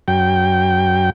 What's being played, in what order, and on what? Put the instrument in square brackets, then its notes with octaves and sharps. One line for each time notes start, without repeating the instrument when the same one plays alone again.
[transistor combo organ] F#2 G5